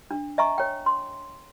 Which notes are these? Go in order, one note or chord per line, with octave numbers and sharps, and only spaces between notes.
D4
D#5 E5 G#5 A#5 C#6
C#5 G5
C6